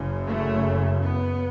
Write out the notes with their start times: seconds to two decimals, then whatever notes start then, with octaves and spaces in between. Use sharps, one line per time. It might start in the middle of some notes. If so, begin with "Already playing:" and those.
Already playing: F#1 F#2 C#3
0.27 A3
1.02 B3